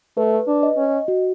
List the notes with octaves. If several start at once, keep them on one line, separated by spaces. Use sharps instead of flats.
A3 B4
D4
D#5
C#4
F#4